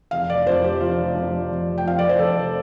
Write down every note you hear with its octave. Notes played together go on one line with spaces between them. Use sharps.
F1 F5
D5
F2 F3 C5
G4
F1 F4
F2 F3
F1
G5
F2 F3 F5
D5
C5
F1 A4